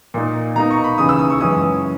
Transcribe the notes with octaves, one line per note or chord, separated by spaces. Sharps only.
A#2 A#3 D#4
B2 A#3 D#4 A#5
C#6
B5
D#2 C#3 E3 D#6
E6
D#6
C#6
F#2 E3 G#3 C#4 D#6